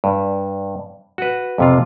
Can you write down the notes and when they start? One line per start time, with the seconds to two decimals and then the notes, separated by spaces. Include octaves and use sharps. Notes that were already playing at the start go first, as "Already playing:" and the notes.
0.04 G2
1.18 F#4 B4
1.58 F2 C3 F4